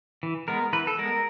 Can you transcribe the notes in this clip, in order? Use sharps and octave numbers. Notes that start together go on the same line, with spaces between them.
E3
G#3 B3 A#4
E3 B4
A4
G#3 B3 A#4